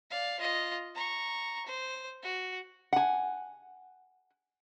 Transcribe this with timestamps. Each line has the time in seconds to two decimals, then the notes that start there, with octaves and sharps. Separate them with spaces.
0.11 D5 F5
0.40 F4 D#5
0.95 A#5 C#6
1.66 C5
2.23 F#4
2.93 F#5 G#5